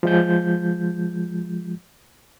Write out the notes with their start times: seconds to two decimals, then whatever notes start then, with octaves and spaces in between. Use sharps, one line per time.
0.03 F3 G#3 G6